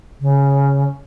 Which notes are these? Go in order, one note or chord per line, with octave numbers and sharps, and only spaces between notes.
C#3